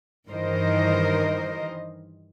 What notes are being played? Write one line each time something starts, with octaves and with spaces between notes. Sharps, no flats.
G2 D#3 E3 A#4 C5 D#5